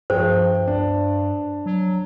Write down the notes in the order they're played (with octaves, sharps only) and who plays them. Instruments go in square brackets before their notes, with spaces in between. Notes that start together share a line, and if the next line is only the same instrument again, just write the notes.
[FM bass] G2 [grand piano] F3 G#4 G5 [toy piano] C5
[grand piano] D4
[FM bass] F#3